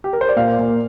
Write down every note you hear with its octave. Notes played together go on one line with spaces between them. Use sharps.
G4
A#4
C5
D5
A#2 F5
A#2